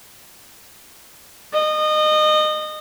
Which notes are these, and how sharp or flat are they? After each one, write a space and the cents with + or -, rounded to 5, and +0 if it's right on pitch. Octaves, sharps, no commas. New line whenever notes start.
D#5 -25